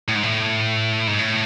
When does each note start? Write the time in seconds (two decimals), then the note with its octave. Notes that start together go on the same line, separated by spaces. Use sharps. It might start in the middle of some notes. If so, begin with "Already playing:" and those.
0.08 A2
0.15 G#2
0.23 A2
1.07 G#2
1.19 A2